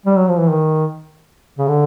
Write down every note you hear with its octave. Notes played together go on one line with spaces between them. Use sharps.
G3
F#3
F3
E3
D#3
C#3
D3